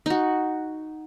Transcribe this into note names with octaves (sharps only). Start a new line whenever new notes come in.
D#4 F#4